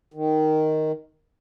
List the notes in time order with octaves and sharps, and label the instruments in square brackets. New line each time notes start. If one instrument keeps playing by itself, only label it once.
[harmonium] D#3